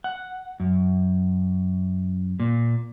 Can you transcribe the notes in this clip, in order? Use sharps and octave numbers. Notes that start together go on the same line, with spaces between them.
F#5
F#2
A#2